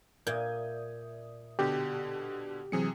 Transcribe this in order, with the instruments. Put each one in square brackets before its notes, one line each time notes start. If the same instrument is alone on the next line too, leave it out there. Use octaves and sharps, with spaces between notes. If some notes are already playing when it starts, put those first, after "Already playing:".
[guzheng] A#2 [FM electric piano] D5 E5 D#6 [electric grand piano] G6 G#6
[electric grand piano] B2 D3 [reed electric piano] G4
[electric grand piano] C3 G#4 C#7 [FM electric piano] E3 F#3 C4